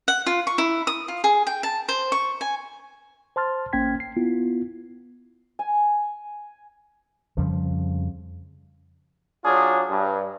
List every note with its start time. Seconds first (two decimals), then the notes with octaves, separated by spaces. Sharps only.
0.08 F#5
0.26 F4
0.47 C#6
0.58 E4
0.87 D#6
1.08 F4
1.24 G#4
1.47 G5
1.63 A5
1.89 C5
2.12 C#6
2.41 G#5
3.36 C5 A5 C6 F6 A6
3.73 G#1 A#3 C#4 G5 G#6 B6
4.00 C7
4.17 B3 E4 F4
5.59 G#5
7.37 F2 C#3 F3 G3
9.44 F#3 D4 F4 G#4
9.89 G2